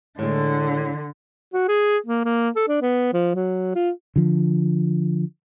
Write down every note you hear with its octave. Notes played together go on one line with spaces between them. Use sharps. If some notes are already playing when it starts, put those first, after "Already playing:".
A2 D3 G#3
F#4
G#4
A#3
A#3
A4
D4
B3
F3
F#3
F4
D3 F3